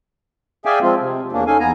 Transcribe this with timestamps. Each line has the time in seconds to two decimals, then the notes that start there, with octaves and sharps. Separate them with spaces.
0.65 G#4 D5 E5 F5 G5 G#5
0.82 F3 G#3 C4 F4
1.00 C3
1.32 E2 A#3 C#4 D4
1.47 C#4 D#4 A4 F5 G#5
1.59 E2 B3 G#5 A#5